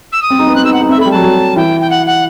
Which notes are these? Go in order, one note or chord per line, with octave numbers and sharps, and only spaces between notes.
E6
D#6
C4
D#4
B3
C4 F#6
D#4 E6
F#5
D#4
C4 E5
A3
B5
G3
F#3 A5
F#3
E3 G5
G5
F#5
F#5